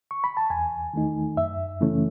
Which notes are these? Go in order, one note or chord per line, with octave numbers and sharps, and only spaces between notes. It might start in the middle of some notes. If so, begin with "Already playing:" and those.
C#6
B5
A5
E2 G#5
D#3 A3 D#4
F#2 E5
C#3 E3 A3 C#4